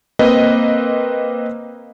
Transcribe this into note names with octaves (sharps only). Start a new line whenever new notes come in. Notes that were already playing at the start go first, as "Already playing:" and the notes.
A#3 C4 B4 D#5